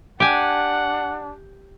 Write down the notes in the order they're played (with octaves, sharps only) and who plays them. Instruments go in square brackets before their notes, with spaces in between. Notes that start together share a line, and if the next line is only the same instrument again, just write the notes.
[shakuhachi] D4 [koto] G4 G#5 [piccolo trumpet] F#5